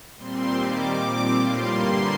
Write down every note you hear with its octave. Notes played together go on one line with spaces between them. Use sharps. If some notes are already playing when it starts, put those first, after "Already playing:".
A#2 G3 C4 C6
D#3 G3 A#3 D6
A#2 F3 C4
A2 G3 A#3 F4 C6
G2 D3 G3 A#3